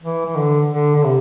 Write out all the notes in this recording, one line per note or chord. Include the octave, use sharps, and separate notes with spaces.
E3
E3
D3
D3
D3
C3